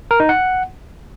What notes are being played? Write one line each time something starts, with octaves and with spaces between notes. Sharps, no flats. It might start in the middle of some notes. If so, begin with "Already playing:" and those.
A#4
D#4
F#5